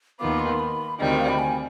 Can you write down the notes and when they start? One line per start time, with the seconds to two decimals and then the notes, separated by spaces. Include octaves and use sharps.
0.19 D#2 D#3 B3 F4 D6
0.39 C6
0.59 B5
0.99 D2 C3 D#3 G3 D#5
1.19 F5
1.29 B5
1.39 G#5